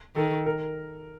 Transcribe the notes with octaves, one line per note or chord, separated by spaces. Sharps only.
D#3 A4
A#4